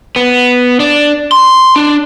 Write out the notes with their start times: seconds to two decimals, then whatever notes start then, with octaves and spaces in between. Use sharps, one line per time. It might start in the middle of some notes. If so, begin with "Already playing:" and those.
0.16 B3
0.80 D4
1.32 C6
1.76 D4